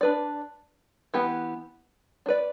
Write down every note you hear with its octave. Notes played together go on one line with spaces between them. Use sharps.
D4 B4 D5
E3 B3 G4
D4
B4 D5